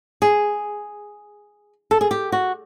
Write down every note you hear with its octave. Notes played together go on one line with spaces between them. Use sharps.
G#4
A4
G#4
G4
F#4